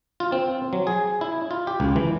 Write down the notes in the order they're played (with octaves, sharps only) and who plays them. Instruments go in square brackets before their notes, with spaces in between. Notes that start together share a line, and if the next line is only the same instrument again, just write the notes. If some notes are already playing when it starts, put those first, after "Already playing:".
[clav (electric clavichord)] F4
C4
F#3
G#4
E4
F4
G4
C#2
E3